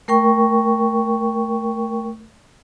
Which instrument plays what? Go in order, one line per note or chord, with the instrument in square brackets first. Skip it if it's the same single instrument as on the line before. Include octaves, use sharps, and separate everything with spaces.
[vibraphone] A3 A#4 G5 C#6